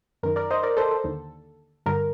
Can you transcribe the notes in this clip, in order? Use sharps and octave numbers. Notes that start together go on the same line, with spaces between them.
F#2 D#3 A#4
A#4 D5
C5 D#5
A#4 D5
A4 C5
A4
D#2 D3
G2 D3 A#4